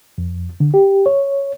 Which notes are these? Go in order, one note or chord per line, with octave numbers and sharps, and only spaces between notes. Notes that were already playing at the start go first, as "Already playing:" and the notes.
F2
D3
G4
C#5